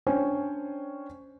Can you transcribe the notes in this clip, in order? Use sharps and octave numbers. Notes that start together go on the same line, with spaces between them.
C#4 D4 C5 C#5 G5 G#5